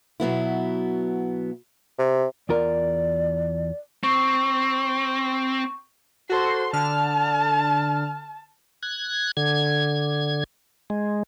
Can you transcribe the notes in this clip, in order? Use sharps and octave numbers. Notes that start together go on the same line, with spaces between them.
B2 F#3 B3 E4
C3
E2 F4 A#4 D5
C4 C#6
F#4 A4 C5 C6
D3 A5 F6
F#6 G#6
D3 G#6
G#3